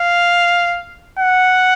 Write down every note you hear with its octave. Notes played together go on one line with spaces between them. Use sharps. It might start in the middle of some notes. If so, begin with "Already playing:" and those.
Already playing: F5
F#5